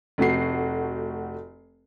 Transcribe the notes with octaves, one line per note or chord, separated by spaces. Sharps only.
F1 A3 F#4 C7